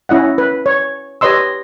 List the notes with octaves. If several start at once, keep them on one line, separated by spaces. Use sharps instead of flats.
C#4 E4 D#5 F#5
B4
C#5
G4 B4 C#5 D#5 C6 E6